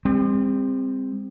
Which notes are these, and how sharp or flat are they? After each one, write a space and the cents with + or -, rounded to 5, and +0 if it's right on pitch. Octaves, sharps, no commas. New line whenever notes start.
G3 +45 C4 +0